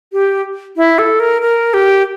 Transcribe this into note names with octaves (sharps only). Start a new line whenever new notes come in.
G4
E4
A4
A#4
A#4
G4